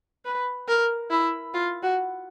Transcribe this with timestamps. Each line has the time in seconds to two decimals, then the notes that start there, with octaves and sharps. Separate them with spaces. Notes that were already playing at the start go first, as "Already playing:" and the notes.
0.25 B4
0.68 A#4
1.10 E4
1.54 F4
1.83 F#4